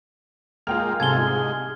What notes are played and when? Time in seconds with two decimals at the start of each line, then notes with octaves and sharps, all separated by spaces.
0.67 G#3 A#3 F4 G5 F6 F7
1.00 C2 G#2 C3 F4 A4 G#5 G#6 G7
1.18 G#3